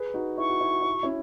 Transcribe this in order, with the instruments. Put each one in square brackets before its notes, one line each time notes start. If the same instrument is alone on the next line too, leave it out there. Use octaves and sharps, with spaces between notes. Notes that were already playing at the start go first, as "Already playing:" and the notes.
Already playing: [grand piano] G#4 B4
D#4 F#4
[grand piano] E4 [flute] C#6
[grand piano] F#4
E4
F#4
E4
F#4
C#4 E4